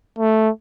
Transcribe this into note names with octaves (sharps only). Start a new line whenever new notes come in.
A3